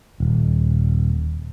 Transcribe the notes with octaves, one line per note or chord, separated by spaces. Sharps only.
D#1